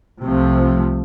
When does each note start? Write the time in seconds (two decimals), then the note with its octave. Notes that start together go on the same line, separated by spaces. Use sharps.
0.22 C2 C3 F3 A3